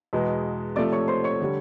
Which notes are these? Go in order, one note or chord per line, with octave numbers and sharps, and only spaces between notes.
E2 B2 G#3
C3 F3 A3 D5 D6
C#5 C#6
C5 C6
C#5 C#6
D3 G3